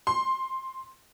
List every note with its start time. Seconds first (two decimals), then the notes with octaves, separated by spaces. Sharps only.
0.07 C6